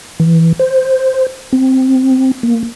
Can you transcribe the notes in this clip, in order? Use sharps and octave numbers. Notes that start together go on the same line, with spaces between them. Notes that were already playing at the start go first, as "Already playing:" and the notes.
E3
C5
C4
A#3